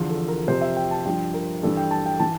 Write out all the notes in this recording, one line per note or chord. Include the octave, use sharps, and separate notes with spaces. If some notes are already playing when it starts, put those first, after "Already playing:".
Already playing: E2 D3 F3 F4
A4
A#4
F2 C3 F3 C5
E5
G5
A5
G2 F3 G5
A#4
G2 E3 A4
G5
A5
G5
E3 A5